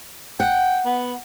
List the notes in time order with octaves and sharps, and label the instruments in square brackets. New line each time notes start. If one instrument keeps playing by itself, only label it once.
[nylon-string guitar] F#5 [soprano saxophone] G5
[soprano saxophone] B3